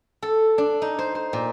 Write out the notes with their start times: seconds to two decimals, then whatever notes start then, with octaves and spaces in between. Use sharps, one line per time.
0.22 A4
0.58 D4
0.82 D#4
0.99 C5
1.15 C5
1.33 A#2